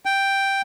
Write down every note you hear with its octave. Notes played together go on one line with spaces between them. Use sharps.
G5